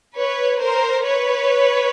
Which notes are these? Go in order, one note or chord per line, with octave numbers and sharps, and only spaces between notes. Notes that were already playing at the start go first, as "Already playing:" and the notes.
B4 C#5
A#4 C5
B4 C#5